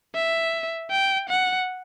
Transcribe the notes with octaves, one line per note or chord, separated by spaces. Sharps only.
E5
G5
F#5